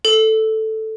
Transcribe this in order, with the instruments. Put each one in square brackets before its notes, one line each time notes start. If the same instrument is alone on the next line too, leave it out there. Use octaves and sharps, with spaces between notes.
[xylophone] A4